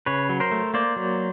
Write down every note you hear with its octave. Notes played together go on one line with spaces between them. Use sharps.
C#3 B4 C#5
F#3
A#4 C5
A3
A#3 C5 D5
F#3